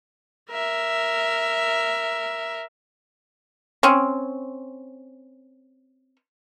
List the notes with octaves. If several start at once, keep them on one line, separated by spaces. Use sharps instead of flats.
A#4 E5
C4 C#4